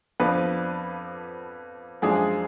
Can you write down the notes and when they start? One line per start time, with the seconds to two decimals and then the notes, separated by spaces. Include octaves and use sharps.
0.20 F2 F3 B3 D4 B4
2.02 F#2 F3 G#3 D4 G#4